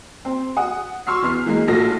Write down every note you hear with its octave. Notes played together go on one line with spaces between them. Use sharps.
C4
F#5 D#6
C6 C#6 E6 F6 C7
E2 B3 F6 C7
E3 G#3 A#3 C7
A#1 A2 F4 F#4 A4 A#6